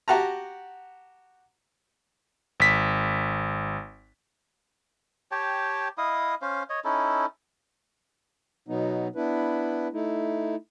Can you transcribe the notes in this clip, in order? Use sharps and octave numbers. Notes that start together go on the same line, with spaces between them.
F#4 G4 F#5 A5 A#5
G#1 B6
G4 C#5 G5 A5
E4 D#5 F5 D#6
C#4 C5 F5
C#5 D#5
C#4 D#4 E4 A4
B2 F#3 B3 D#4
B3 D4 E4 B4
A3 D#4 E4